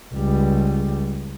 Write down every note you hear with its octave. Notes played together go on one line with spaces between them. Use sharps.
C#2 G3